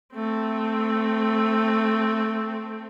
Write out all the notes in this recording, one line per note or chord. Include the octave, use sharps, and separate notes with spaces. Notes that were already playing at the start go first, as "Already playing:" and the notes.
A3 C4